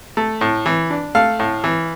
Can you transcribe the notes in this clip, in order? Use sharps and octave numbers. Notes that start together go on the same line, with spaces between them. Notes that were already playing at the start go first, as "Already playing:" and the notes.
A3
A2
E3
D4
A3 F5
A2
E3